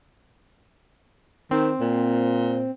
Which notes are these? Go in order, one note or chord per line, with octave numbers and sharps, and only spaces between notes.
D#3 C4
A#2